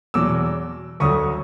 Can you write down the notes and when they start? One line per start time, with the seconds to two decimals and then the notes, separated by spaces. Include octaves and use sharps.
0.14 E2 B2 F#3 D6 E6
1.00 D2 D3 F#3 C#6 D#6